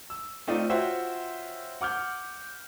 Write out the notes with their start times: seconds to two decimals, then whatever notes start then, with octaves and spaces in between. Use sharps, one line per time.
0.10 E6
0.47 A3 C4 D#4 F4 D5
0.70 F4 F#4 C5 C#5 E5 G5
1.81 F#5 D6 F6 G6